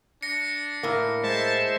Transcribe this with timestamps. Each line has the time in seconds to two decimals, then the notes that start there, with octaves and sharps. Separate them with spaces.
0.23 D4 A#6 C#7
0.83 A2 A#3
1.24 G#3 C5 E5 A5